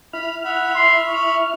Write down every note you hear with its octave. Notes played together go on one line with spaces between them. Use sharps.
E4 B5 F6
E5 F#5 B5
C6
C#6